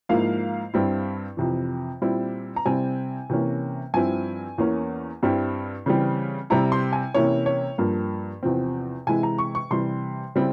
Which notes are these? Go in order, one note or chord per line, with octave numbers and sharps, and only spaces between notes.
G#2 F3 A#3 E4 F5
G2 G3 C4 E4
F2 C3 E3
A#2 G3 C4 E4
A#5
C3 G3 C4 E4 G#5
C3 E3 A#3 C#4
G2 F3 C4 E4 G#5
E2 E3 A#3 C#4
G2 G3 C4 E4
C#3 E3 G3 C4
C3 G3 C4 E4 A#5
C6
G#5
C3 E3 A#3 C#4 E4 C#5
C#5
G2 F3 A#3
E2 C3 F3 C4
C3 E3 G#3 E4 G#5
A#5
C#6
C#6
C3 E3 G3 C6
C#3 G3 C4 E4